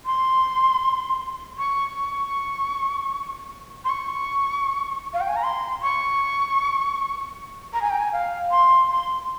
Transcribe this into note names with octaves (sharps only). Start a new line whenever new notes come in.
C6
C#6
C#6
C6
C#6
F5
G5
G#5
A#5
C6
C#6
A#5
G#5
G5
G#5
F5
C6
C6